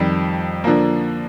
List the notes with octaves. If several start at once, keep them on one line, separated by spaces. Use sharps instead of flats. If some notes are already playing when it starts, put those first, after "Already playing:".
Already playing: F2 D#3 G3
D3 F3 A#3